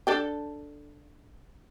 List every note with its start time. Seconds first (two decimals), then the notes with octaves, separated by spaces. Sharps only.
0.07 D4 A4 G5